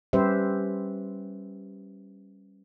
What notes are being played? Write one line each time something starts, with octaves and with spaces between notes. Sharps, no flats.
G3 C#4 G4 B4 C5 E5